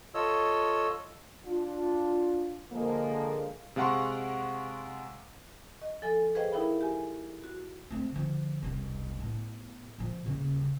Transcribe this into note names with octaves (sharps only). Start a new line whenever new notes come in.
F4 A4 C#5 D#5 E6
D4 F4
D3 F3 G#3 A#3
C3 G#3 F5 F#5 C6 C#6
D#5
F3 A4 G#5 A6
G#4 B4 C5 D#5 F5 G5
D#4 E4 A#4 E5 G5 B5
G4 G#5
F#4
A3 C4
D3 F3
E1 C2
A2 B3
A#2 F3
D#1 C#3